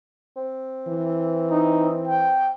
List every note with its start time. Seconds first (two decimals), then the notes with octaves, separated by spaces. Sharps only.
0.36 C4
0.88 E3
1.50 D#4
2.08 G5